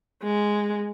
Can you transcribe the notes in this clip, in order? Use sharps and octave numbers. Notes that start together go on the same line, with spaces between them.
G#3